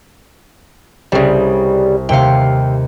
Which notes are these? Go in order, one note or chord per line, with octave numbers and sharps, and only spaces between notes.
C2 C#3 G3
D#2 C3 F5 G5 C#7